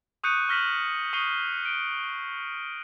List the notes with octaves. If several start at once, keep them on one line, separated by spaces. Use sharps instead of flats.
C#6 D#6 F#6 G6 C#7 D#7
C#6 F6 A#6 B6 E7 F#7
C#6 D#6 C7 D#7 G7
D7